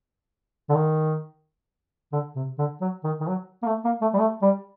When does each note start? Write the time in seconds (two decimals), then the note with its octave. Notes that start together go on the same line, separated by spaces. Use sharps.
0.69 D3
0.75 D#3
2.12 D3
2.36 C3
2.58 D3
2.81 F#3
3.04 D#3
3.20 D#3
3.28 F#3
3.63 A#3
3.67 A3
3.85 A#3
4.01 A3
4.14 G3
4.19 A3
4.42 G3